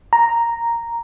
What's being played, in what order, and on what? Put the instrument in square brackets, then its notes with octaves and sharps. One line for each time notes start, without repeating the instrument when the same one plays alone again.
[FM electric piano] A#5